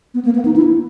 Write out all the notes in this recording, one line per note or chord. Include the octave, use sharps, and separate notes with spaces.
B3
A#3
B3
D#4
E4